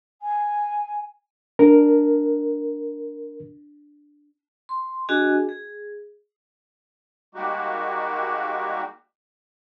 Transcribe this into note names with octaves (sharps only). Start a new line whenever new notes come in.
G#5
D4 A#4
C6
D4 F#4 G#4 D#5 G#5
G#4
G3 G#3 A#3 D#4 F#4 G4